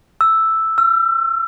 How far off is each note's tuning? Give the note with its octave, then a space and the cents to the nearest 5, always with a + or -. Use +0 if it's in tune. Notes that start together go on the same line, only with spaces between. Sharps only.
E6 +0
E6 +40